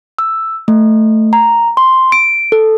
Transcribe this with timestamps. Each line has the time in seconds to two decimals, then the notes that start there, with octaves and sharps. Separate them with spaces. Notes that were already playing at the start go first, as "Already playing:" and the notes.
0.19 E6
0.68 A3
1.33 A#5
1.77 C6
2.12 D7
2.52 A4